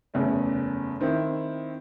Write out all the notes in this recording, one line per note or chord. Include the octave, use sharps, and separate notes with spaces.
F#1 E2 A3 C#4
D#3 C4 E4